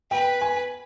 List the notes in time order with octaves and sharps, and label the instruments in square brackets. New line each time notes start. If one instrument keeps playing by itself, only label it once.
[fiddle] B4 [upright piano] G5
[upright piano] G#5